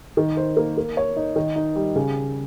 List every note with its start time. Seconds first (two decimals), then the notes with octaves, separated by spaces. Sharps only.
0.17 D#3
0.37 C5
0.57 A#3
0.77 A#3
0.97 C#5
1.16 D#4
1.36 D#3
1.56 D#4
1.76 G3
1.96 C#3